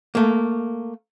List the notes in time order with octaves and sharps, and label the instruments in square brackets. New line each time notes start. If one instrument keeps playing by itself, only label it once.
[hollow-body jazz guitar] A3 A#3